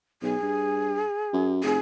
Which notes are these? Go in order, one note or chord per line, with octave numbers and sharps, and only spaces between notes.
B1 G#4
G2
F#2
F1 G#4